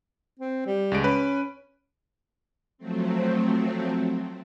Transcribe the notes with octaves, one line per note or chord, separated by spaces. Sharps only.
C4
G3
C#2 G#3 D7
C#4 B4
F3 F#3 A3 C4